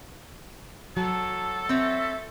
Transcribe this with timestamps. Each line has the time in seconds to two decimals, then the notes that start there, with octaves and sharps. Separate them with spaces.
0.97 F#3 A4 A5
1.69 C4 C#5 E5